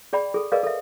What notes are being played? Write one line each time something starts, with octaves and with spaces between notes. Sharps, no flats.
G#4 D5 G5 B5
G#4 A4
G#4 A#4 B4 D5 D#5 F5
A4 E5